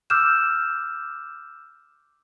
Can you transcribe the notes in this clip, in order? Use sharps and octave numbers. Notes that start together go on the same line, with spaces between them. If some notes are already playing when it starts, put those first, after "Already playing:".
D6 E6 F6 G6 E7